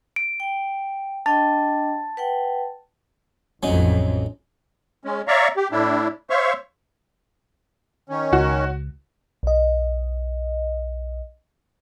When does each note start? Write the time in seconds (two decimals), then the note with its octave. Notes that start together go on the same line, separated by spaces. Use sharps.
0.16 D7
0.40 G5
1.26 D4 D#5 G5 A5 A6
2.17 B4 F#5 G5
3.63 A1 F2 F#3 C#4 D#4
5.04 G#3 C#4
5.28 C#5 D5 E5 F5 A#5 C#6
5.56 G4
5.71 A2 D4 E4
6.30 C5 C#5 E5 F5 C#6
8.10 D#3 C#4
8.33 C#2 F#4
9.43 B1 D#5